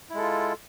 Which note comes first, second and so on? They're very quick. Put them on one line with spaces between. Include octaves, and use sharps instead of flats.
E4 G#3 A4 F4